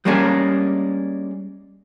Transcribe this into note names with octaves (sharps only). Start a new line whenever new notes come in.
G3 G#3 A#3 C#4 D4 G#4